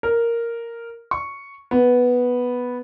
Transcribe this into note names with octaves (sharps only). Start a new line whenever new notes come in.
A#4
C#6
B3